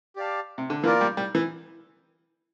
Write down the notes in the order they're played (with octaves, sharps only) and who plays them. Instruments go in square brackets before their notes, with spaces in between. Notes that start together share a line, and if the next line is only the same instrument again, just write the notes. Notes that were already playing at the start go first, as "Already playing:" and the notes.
[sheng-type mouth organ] G4 D5 F5 A5
[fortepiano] C3
D3
[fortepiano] E3 [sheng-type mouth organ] A#3 F4 A#4 D5
[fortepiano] G3
G3
E3